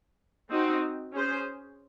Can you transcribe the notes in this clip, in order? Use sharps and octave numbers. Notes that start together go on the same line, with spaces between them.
C4 D#4 F#4
C#4 G#4 C5